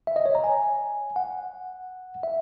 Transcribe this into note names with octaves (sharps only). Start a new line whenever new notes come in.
E5
D#5
C#5
A#5
G#5
F#5
E5